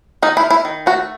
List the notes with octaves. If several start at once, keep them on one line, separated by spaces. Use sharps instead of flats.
D#3 D#4
E4
D#3
E4
D#3
A3 F#4